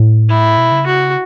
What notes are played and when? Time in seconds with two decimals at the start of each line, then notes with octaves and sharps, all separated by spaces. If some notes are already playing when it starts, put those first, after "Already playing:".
Already playing: A2
0.29 E4
0.57 B2
0.72 C#3
0.86 F#4